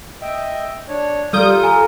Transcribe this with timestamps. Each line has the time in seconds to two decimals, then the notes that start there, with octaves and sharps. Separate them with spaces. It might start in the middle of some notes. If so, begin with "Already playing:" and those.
0.21 D#5 E5 G5
0.88 D4 C#5
1.33 G3 F4 A4 A#4 D#6 G6
1.63 G#5 A#5